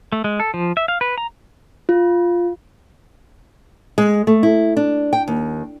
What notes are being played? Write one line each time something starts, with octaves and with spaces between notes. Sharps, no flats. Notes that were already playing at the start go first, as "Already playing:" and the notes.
A3
G#3
A4
F3
E5
F5
B4
A#5
F4
G#3
A3
E4
D4
G5
D#2